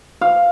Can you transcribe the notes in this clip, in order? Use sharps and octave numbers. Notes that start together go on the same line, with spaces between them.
F5